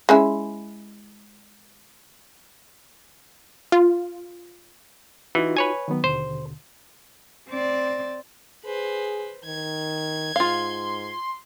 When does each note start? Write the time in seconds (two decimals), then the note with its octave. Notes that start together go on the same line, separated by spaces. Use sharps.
0.09 G#3 C#4 E4
3.72 F4
5.35 E3 D#4 F4 F#4
5.57 B4 C#5 G#5
5.88 D#3 F#3 B3
6.04 D#2 B2 D3 C5
7.50 C4 D5
8.65 G#4 B4 C5
9.45 D#3 G#6
10.36 G#2 F4 F5 C6